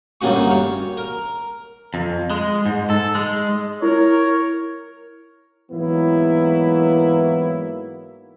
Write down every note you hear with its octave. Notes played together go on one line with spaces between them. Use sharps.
D2 G2 A#3 C#4 F#4 C#6
C#5
A#4
F2
G#3
G#2
A4
G#3
E4 A#4 C#5
G#2 E3 F#3 A#3 B3 E4